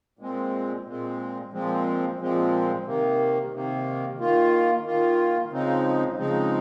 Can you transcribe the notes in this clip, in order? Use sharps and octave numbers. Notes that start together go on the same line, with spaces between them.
A#2 G#3 C4
A#2 G#3 C4
A#2 F3 G#3 C4
A#2 F3 G#3 C4
C3 D#3 A#3
C3 D#3 A#3
D#3 A#3 F4
D#3 A#3 F4
C#3 F3 G#3 C4 D#4
C#3 F3 G#3 C4 D#4